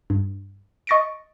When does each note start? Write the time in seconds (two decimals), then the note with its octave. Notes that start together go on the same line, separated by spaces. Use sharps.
0.10 G2
0.87 D#5 C#6 A6 A#6 C#7 D7